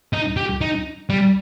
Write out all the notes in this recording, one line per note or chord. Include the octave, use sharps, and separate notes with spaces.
D#4
G4
D#4
G3